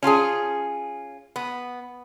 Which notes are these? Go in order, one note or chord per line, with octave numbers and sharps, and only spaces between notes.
C#4 F4 G4 G#4
B3